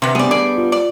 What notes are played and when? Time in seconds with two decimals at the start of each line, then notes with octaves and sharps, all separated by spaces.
0.02 C3 G3 B3
0.15 G3 B3 D4 G#4 D5
0.31 G#4 D5
0.57 F4
0.72 D5